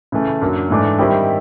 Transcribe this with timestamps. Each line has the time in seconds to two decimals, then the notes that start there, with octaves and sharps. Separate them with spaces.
0.12 C#3 E3 A3
0.41 F#2 D3 F#3 A#3
0.70 G#2 E3 A3 D4
0.99 D#3 G3 C4 E4 G4